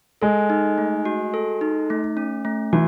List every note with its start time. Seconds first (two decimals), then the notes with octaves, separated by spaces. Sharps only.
0.22 G#3 A4
0.50 D#4
0.78 A3
1.05 F#4
1.34 A4
1.61 D#4
1.90 A3
2.17 C#4
2.45 A3
2.73 E3 F#4